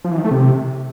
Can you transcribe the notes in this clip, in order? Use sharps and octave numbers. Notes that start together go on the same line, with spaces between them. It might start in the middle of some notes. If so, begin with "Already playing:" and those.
F3
E3
D#3
A3
C3